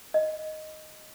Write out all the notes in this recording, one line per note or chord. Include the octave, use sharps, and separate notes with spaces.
D#5